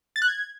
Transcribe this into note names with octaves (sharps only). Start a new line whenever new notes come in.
A6
F#6
G#6